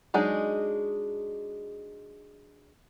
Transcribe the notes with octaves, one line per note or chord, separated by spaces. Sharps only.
F#3 G#3 D4 D#4 G#4